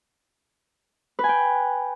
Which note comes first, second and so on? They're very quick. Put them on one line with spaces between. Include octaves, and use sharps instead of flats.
B4 G#5 G5